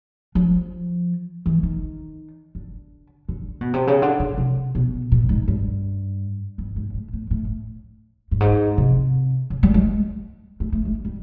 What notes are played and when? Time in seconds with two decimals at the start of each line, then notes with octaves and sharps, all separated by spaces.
0.35 F3
1.46 E3
1.63 D#3
2.55 D3
3.29 D3
3.61 B2
3.73 C3
3.87 C#3
4.02 D3
4.19 C#3
4.38 C3
4.75 B2
5.12 A#2
5.29 G#2
5.48 G2
6.58 G2
6.76 G#2
6.94 A2
7.13 A2
7.31 A2
8.31 G2
8.40 G#2
8.78 C3
9.50 C#3
9.63 G3
9.74 G#3
10.60 A3
10.72 A3
10.85 G#3
11.05 G3